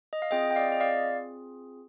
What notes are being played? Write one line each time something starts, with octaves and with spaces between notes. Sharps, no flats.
D#5
F5
C4 F4 G#4 D#5 G5
G5
D5 F5
D#5
D5 F5